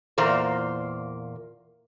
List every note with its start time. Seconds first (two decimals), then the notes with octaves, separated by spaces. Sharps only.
0.18 E2 A#2 A#3 C5